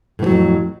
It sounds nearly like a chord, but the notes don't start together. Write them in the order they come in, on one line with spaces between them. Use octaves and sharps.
A2 E3 F#3 F2